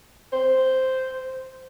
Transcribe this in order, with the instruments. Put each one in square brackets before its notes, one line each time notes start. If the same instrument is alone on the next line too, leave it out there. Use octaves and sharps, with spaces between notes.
[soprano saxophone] C5